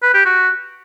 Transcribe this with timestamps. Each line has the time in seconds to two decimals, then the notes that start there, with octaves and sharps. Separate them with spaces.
0.03 B4
0.14 G4
0.26 F#4